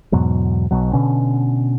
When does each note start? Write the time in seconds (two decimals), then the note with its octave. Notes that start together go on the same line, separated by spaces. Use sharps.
0.12 E2 G#2 B2 F#3
0.71 B1 B2 F#3
0.93 B2 D3 C#4